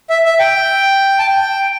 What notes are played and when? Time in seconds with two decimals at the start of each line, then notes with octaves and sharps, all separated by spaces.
0.10 E5
0.25 E5
0.39 G5
1.19 A5
1.28 G5